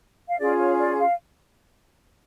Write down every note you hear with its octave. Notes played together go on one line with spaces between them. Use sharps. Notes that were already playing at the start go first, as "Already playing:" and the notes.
F5
C#4 F4 G#4 D5
C#5
D5
F5